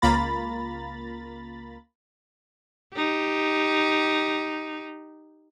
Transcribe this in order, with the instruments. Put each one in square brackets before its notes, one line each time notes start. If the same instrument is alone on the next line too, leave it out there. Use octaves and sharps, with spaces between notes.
[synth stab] C#2 A#3 F4 A#5 B5 A6
[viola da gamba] D#4 G4